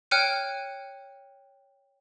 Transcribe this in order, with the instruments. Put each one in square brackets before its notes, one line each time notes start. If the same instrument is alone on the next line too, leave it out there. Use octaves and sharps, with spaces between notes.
[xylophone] C#5 G5 F6 F#6 C#7 D#7